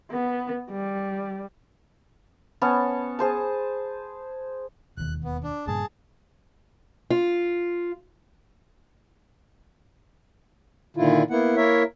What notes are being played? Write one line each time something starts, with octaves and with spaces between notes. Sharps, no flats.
B3
G3
B3 C#4 C#5 A5
G#4 C5 A5
E1 D#2 F#6
B3
D4
G2 A#2 C#3 G#4 A5
F4
A#2 D3 D#3 E4 F4
A#3 B3 E4 F#5
A#3 E4 A#4 C#5 E5